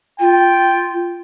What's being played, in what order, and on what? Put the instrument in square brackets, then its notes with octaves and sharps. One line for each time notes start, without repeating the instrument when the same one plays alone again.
[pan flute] F4 [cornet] G5